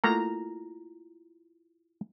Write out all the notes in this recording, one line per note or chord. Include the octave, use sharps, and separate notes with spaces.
A3 A#3 E4 F4 F#5 A#5